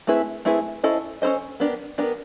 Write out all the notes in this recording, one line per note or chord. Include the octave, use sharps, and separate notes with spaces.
A3 C4 E4 G#4 B4
A3 C4 E4 G#4 B4
C#4 E4 A4 C5 D#5
C#4 E4 A4 C5 D#5
B3 D4 G4 A#4
B3 D4 G4 A#4